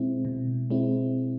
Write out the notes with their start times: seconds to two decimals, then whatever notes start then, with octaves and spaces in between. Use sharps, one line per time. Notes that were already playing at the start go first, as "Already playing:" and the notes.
Already playing: B2 G#3 C4 E4
0.25 B2
0.70 G#3 C4 E4